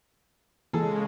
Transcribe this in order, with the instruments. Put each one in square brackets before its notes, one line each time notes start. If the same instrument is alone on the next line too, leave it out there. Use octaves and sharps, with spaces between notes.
[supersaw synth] C#3 G#3 [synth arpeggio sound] E3 A#3 [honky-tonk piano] G#4 A4